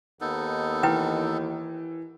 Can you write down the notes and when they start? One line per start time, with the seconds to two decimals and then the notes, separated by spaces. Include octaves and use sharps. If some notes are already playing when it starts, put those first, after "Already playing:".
0.21 D#2 B3 D#4 A4
0.83 E3 E4 B4 G5